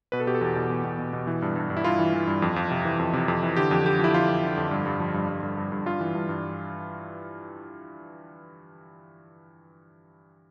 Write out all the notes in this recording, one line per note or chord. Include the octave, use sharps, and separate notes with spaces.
B2 B4
A4
B2 G4
A4
E2
B2
E2
B2
B2
B2
E3
G2
G2
G2
E4
G2 F4
E3
E3
G2
F2
F2
C3
E3
F2
C3
F2
E3
D3 G4
F2
D3 G4
F3 E4
F2 F4
F2
D3
F2
G2
G2
F3
G2
G2
G2
G2
G2
G2 F4
E3
G2
G2